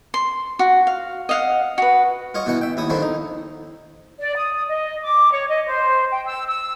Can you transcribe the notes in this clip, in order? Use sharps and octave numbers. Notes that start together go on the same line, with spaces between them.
C6
F#4
F5
D#5 F5 F#5
F#4 B4
F4 C#5 D#5
B2 E3 B3 F#5
E5 G5
D#2 E4 D#6
D3 D#3 F3 C4 E4
D#4
D5
D#6
D#5
D6
C#5
D#5
C5
G5
E6
E6